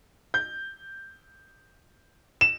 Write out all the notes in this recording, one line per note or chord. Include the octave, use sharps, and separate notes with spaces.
G6
E7